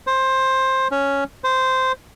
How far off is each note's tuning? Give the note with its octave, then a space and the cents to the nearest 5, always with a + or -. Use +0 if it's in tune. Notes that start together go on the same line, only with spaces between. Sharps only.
C5 +15
C#4 +5
C5 -10